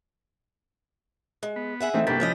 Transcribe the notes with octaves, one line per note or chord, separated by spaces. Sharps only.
G#3
B3
G#4 E5 F#5
E3 A3 C4 D#4
C2 G2 B2 A#3 G4 A4 B4
G2 F3 C#4 D#5